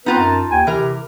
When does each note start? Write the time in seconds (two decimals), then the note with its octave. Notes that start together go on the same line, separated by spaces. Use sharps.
0.06 B3 C4 D#4 F4 B4 A#5
0.18 F#2 A5
0.50 D#2 G5 G#5
0.67 C3 E3 A#4